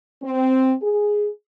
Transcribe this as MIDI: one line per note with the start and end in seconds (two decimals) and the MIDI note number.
0.22 0.73 60
0.81 1.29 68